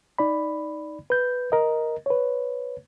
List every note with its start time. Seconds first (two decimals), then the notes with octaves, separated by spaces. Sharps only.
0.18 D#4 D5 B5
1.10 B4 G6
1.52 A#4 D#5
2.06 B4 C#5